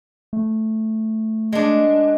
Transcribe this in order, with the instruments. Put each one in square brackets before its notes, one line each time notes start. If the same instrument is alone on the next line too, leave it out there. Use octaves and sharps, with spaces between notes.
[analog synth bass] A3
[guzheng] G#3 D4